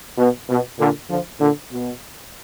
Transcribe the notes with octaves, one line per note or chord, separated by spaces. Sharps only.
B2
B2
A#2 D3
D3 F3
A#2 D3
B2